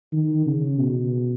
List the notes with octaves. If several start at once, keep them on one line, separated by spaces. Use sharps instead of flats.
D#3
C#3
B2